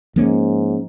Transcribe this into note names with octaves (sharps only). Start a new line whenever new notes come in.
G#2 F3 A#3 C#4